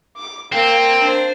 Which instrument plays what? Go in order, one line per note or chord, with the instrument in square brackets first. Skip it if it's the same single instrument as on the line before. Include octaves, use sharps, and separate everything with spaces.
[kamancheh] D6
[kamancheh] A#3 [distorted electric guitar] C4
[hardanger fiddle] D4 C5